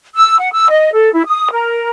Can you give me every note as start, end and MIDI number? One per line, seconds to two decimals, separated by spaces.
0.16 0.36 88
0.38 0.52 78
0.52 0.68 88
0.70 0.93 75
0.93 1.10 69
1.14 1.23 64
1.26 1.50 87
1.51 1.90 70